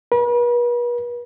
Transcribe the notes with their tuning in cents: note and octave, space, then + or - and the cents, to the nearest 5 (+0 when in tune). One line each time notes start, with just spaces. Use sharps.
B4 -40